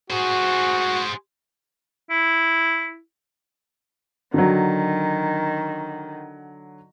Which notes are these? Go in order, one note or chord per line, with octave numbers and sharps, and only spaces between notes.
F#4 G#4 C5
E4
D3 D#3 F#3